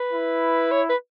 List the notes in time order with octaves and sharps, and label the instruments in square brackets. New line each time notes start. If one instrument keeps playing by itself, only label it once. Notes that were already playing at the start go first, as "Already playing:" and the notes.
Already playing: [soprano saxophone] B4
[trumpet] E4
[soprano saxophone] C#5
B4